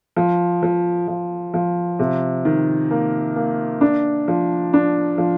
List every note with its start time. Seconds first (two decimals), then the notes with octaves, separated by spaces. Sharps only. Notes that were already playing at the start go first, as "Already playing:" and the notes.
0.17 F3
0.63 F3
1.08 F3
1.54 F3
1.99 C3
2.45 D#3
2.91 A#3
3.36 A#3
3.81 D4
4.28 F3
4.73 D4
5.18 F3